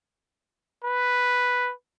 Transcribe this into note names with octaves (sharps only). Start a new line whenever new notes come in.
B4